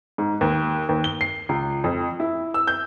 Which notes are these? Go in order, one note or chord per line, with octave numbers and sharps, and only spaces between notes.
G#2
D#2
D#2
G7
C7
C#2
F2
E4
E6
G6